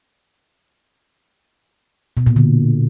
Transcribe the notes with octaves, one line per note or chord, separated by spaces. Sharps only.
B2
A#2
D3